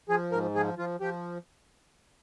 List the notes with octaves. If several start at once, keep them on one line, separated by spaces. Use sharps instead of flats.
F3 G#4
G#2 A#4
F3 G#4
F3 F4
F3 G4